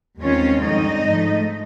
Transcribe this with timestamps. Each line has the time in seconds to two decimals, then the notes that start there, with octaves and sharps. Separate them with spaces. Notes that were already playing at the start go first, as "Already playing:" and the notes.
0.20 D#2 D#3 G#3 C4 C#4 F4 C#5
0.61 G2 D3 F3 G#3 C4 D#4 D#5
1.03 G#2 F3 A3